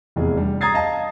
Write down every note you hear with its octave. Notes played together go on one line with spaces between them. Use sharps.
F1 E2 G#4
G3 D4
A#5 D#6 G#6 A6 C7
D#5 F5 A5